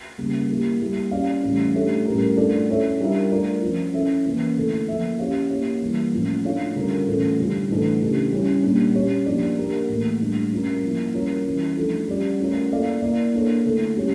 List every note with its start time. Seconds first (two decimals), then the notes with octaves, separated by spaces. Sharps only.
0.18 C#3 G3 A#3
0.49 A#3 E4 G4
0.81 G3 A#3 E4 G4
1.11 C#4 G4 D5 F5
1.43 A2 E3 G3 C#4
1.75 A3 D4 G4 C#5 E5
2.06 A2 G3 C#4 G4 A#4
2.37 A3 D4 F4 A4 D5
2.69 C#4 E4 A4 C#5 E5
3.00 G3 D4 F4 A#4 E5
3.31 A3 D4 F4 A#4 D5
3.62 F3 C#4 F4
3.93 C#4 E4 A4 E5
4.25 E3 A#3 C#4 E4
4.57 D3 A3 E4 A4
4.88 F3 A#3 E4 A4 E5
5.19 C#4 G4 C#5 F5
5.50 A#3 E4 G4 C#5
5.82 E3 G3 A#3
6.13 A2 F3 C#4 F4
6.45 A3 D4 F4 C#5 F5
6.75 D3 G3 C#4 F4 A#4
7.07 A2 E3 A3 C#4 F4
7.39 D3 G3 C#4 F4
7.69 A2 E3 A3 D4 A4
8.01 C#3 E3 A3 D4 G4
8.32 G3 C#4 E4
8.63 A#2 G3 A#3 D4
8.95 C#4 G4 C#5
9.26 F3 A#3 D4 G4 D5
9.58 A#3 D4 G4 A#4
9.89 A2 E3 A#3
10.20 A2 G3 D4
10.51 G3 C#4 F4 A#4
10.83 F3 A#3 E4
11.14 G3 C#4 F4 A#4 C#5
11.45 E3 G3 C#4 E4
11.77 F3 A3 D4 F4 A4
12.08 G3 C#4 G4 D5
12.39 A3 C#4 F4 A#4 C#5
12.71 A#3 E4 A4 D5 F5
13.01 A#3 E4 A#4 D5 F5
13.33 A#3 D4 A4 C#5
13.65 D3 A3 E4 A4
13.96 G3 C#4 G4 C#5